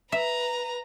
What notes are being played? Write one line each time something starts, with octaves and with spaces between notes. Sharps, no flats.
B4 E5 A#5